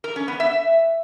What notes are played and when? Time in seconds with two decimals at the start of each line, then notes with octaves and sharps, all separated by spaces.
0.04 A#4
0.16 C#4
0.28 B3
0.40 E5